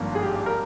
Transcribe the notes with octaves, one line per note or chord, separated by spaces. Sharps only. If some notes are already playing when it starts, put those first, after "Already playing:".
Already playing: G#1 G2 F3 A#3
G#4
G4
A#4